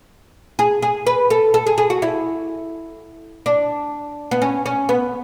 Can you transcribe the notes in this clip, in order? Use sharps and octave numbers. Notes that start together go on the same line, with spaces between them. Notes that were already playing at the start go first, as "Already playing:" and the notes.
G#4
G#4
B4
A4
A4
G#4
G#4
F#4
E4
D4
B3
C#4
C#4
B3